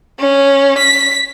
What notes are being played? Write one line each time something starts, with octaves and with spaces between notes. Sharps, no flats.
C#4
B6